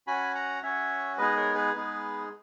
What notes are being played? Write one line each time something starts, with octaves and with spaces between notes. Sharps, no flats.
C#4 F#4 G#5 B5
F#5 A#5
C#4 F#4 C#5 E5
G#3 B3 D#4 G#4 B4 D#5
A#4 C#5
G#4 B4
G#3 B3 D#4 G#4